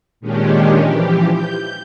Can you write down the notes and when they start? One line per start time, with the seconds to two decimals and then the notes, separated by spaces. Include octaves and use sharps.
0.20 A#2 D#3 G#3 C#4 D4 G4
0.84 E3 F3 G4
1.33 G6